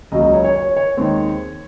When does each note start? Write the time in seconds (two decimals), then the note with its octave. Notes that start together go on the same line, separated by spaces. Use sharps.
0.12 C#2 C#3 F#3 A#3 D#5
0.22 D#5
0.33 C#5
0.44 C#5
0.55 C#5
0.76 C#5
0.97 D#2 D#3 G#3 C4